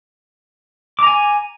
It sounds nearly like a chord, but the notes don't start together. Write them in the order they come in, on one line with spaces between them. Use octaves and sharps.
D6 A#5 G#5